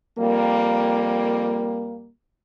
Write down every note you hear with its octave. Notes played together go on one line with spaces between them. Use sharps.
F2 G3 A#3